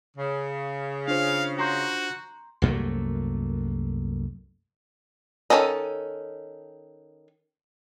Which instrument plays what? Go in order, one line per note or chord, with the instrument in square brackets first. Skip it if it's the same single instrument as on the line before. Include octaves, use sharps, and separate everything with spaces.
[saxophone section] C#3
[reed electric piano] D4 F4 C5 [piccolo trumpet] F5
[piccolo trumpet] F#4 [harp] A#5 C6 G6
[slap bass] C2 F#2 A3 A#3
[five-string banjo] D#3 E3 C#4 A4 D#5